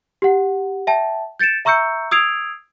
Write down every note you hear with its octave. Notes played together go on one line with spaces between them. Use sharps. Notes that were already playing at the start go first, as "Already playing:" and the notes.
G4 F#5
E5 G5 A5
G6 A6 C#7 D7 E7
E5 A#5 C#6 E6 G6 C#7
D#6 E6 G#6 C7 D7 F7